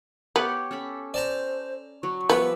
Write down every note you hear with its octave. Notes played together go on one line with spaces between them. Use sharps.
B3 G4 C#5
C#4 A4 B5
C5 D5 A5 A#5
F#3 C#6
F3 G3 B3 B4 E5